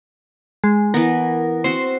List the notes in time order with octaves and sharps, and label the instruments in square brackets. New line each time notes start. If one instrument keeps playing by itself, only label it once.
[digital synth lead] G#3
[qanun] E3 B3 [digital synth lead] A#4
[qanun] C4 F#4 [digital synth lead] C5